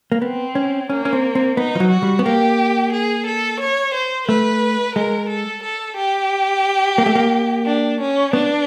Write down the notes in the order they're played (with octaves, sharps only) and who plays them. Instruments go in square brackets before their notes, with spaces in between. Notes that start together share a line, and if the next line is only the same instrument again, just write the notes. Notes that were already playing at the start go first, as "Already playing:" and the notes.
[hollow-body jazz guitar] A#3
[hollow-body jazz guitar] B3 [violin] C4
[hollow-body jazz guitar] C#4
[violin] A#3 [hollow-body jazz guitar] C#4
[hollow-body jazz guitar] C#4
C4
C4
[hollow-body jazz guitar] B3 [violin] D#4
[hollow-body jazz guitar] F3
F#3
[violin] F#4
[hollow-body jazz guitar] G3
B3
[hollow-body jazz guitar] A#3 [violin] G4
[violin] G#4
A4
C#5
C5
[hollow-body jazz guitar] A3 [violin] B4
[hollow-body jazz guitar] G#3 [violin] A#4
[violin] A4
A4
G4
[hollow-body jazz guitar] A#3
A3
A#3
[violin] D4
C#4
[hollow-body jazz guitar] B3 [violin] D4